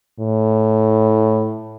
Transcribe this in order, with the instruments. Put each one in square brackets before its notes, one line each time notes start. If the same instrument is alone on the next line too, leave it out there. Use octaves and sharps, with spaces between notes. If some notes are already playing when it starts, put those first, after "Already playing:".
[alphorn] A2